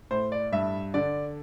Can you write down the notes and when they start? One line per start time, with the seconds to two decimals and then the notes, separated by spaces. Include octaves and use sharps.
0.11 A2 C5
0.32 D5
0.52 G2 E5
0.94 D3 D5